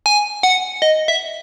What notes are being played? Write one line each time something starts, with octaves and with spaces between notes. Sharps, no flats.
G#5
F#5
D#5
E5